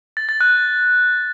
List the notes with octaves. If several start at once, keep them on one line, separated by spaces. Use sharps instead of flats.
A6
A6
F#6